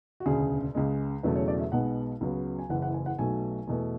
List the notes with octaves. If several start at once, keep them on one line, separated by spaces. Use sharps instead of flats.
F#4
E1 D2 C#3 G#4
C#2 C#3 G#3
E1 E2 C#3 F#3 A3 B4
C#5
D5
E5
B1 B2 G#3 B3 F#5
C#2 C#3 F#3 B3
G#5
F#1 F#2 C#3 E3 F#5
F#5
G#5
F#5
B1 B2 F#3 A3 G#5
E2 B2 A3